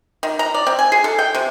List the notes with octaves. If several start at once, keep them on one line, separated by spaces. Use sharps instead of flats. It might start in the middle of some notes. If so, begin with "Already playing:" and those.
D#3
A#5
D5
C4
G#5
G#4
A4
G5
C3